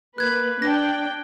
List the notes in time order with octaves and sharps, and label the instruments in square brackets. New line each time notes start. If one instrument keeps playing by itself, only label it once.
[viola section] A#3 B4 [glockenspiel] F#6 G#6
[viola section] D4 G5 [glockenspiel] A#6